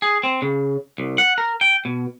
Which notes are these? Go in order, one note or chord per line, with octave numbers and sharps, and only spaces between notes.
G#4
C4
C#3
C2
F#5
A#4
G5
B2